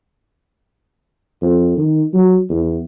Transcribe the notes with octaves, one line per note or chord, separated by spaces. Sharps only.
F2
D#3
F#3
E2